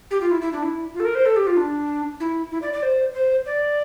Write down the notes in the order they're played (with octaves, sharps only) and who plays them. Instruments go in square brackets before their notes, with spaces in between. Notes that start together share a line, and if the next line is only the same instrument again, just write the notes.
[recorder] G4
F4
E4
E4
D4
E4
F4
A4
A#4
C5
A4
G4
F4
D4
E4
E4
D5
D5
C5
C5
D5